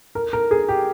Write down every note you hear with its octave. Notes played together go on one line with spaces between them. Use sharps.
A#4
A#4
G#4
G4